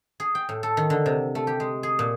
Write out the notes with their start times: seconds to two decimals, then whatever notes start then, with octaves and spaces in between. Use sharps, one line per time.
0.20 G#4
0.35 G5
0.49 A2
0.63 A4
0.77 D#3
0.90 D3
1.06 C3
1.35 A3
1.47 G4
1.60 G#3
1.83 G#4
1.99 A#2